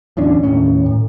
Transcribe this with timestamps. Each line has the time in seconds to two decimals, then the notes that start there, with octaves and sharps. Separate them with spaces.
0.17 D1 E2 C#4 D4
0.43 D#2 A2 C#4
0.86 A2